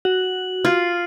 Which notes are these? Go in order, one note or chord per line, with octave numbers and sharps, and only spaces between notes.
F#4 F#7
F4 F6 C7